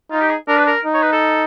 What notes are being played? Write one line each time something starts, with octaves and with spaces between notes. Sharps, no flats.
D#4 F4
G4
G#4
D4 A#4
B4
A#4
D#4
C#5
B4
A4